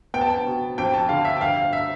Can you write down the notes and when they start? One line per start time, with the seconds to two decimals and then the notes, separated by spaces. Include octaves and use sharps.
0.14 B3 G5
0.21 A5
0.30 G5
0.46 B2
0.78 F2 G5
0.94 A5
1.09 D3 F5
1.25 E5
1.37 G5
1.41 G1 F5
1.57 F5
1.73 E5